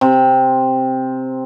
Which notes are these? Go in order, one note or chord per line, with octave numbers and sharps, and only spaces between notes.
C3